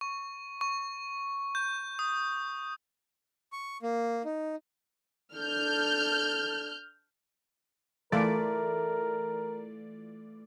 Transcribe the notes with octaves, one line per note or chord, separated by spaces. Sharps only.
C#6
C#6
G6
D#6
C#6
A#3
D#4
D4 A4 F6 G6
E3 A3 F4 A#4 D5 D7